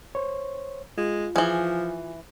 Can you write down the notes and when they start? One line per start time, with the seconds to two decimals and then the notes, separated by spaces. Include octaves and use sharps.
0.15 C5 C#5
0.98 G#3 F4
1.36 E3 F3 G#4